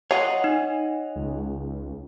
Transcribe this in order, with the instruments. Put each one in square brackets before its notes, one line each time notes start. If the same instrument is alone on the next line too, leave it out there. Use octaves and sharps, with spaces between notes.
[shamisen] F#3 F4 [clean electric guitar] C#5 D#5 F#5 [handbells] C7
[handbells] D#4
[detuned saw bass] C#2